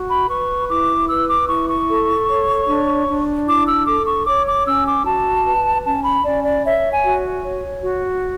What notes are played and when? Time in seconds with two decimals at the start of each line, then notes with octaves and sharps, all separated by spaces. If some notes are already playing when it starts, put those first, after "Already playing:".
Already playing: F#4
0.10 B5
0.29 B4 C#6
0.69 E4 D6
1.08 B4 E6
1.28 D6
1.48 E4 C#6
1.68 C#6
1.88 A4
2.28 C#5
2.67 D4
3.07 D4
3.47 E4 D6
3.67 E6
3.86 A4 D6
4.06 C#6
4.26 C#5 D6
4.46 D6
4.66 C#4 E6
4.86 D6
5.06 F#4 A5
5.45 B4
5.85 C#4 A5
6.05 B5
6.24 C#4 D5
6.44 D5
6.64 C#5 E5
6.91 G#5
7.04 F#4
7.43 C#5
7.83 F#4